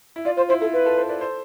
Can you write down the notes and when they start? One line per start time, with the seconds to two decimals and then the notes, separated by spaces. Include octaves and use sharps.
0.16 E4
0.25 F4 D5
0.37 F4 C5
0.49 E4 C5
0.61 E4 A4
0.73 F4 B4
0.84 F4 A4
0.97 A4 C5
1.09 B4 D5
1.21 A4 C5